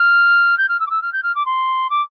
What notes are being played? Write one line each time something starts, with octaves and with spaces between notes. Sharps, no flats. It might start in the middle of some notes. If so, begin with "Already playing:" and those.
Already playing: F6
G6
F6
E6
D6
E6
F6
G6
F6
D6
C6
D6